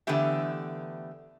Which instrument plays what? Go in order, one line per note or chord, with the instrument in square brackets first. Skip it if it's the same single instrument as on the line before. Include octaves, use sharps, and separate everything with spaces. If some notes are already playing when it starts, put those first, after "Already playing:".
[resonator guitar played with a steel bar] D3 E3 A3 B3 G4 E5